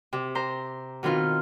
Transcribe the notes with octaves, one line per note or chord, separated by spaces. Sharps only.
C3
C5 A#5
B2 D#3 C4 F4 F6